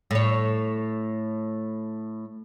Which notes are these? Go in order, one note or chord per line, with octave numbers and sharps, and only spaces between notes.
A2 C#5